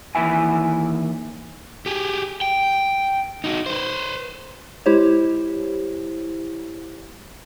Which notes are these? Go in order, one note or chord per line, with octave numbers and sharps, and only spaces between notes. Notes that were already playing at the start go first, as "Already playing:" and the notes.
D#2 E3 E4 E5 G#5
G4 G#4
G5
D#4 F#4
B4 C5
G#3 E4 G4 C5 C#5